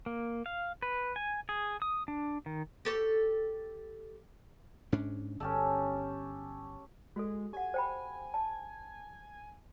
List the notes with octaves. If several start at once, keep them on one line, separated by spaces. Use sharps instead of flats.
A#3
F5
B4
G#5
G#4
D#6
D4
D#3
G4 A4 C#5
G#2 C#4 D4
G1 C#4 G4 A4
G#3 F#4 A4
G4 F#5 G#5
C5 G5 B5
A5